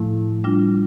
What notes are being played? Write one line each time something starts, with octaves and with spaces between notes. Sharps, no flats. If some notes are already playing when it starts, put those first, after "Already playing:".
Already playing: A2 F3 A3 E4
G3 D4 F4